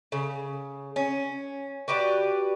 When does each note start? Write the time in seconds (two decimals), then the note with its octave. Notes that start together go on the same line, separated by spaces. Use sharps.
0.12 C#3
0.96 C#4
1.88 F#4 G4 B4 D5